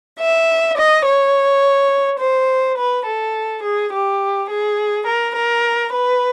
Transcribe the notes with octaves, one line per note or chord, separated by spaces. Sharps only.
E5
D#5
C#5
C5
B4
A4
G#4
G4
G#4
A#4
A#4
B4